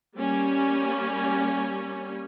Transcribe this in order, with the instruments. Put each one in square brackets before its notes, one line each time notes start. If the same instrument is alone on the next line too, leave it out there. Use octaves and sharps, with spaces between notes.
[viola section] G3 A#3 C#4